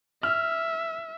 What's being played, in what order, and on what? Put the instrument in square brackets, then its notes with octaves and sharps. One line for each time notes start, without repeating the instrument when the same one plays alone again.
[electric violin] E5 [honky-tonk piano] F6